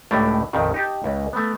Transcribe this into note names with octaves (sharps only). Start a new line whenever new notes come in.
C#2 A2 A3 D4 G4
A#1 F2 D#3
D#4 G4 A5
C#2
A3 B3